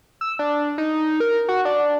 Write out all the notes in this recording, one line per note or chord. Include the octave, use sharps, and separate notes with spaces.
E6
D4
D#4
A#4
F#4
D4